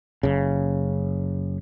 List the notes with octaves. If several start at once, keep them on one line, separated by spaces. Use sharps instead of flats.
F#1 C#3